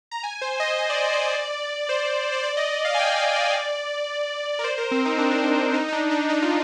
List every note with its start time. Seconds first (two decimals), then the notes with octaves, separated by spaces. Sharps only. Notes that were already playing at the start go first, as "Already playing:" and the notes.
0.11 A#5
0.23 G#5
0.42 C5
0.60 D#5
0.78 D#5
0.90 D5
1.02 C5
1.13 D5
1.89 C5
2.32 C5
2.44 D5
2.57 D#5
2.71 D#5
2.85 F5
2.94 G#5
2.99 G5
3.17 F5
3.36 D5
4.59 A#4
4.64 C5
4.78 A#4
4.91 C4
5.05 D#4
5.18 D4
5.30 C4
5.43 D4
5.74 D#4
5.88 D#4
5.92 D4
6.11 D4
6.29 D#4
6.42 F4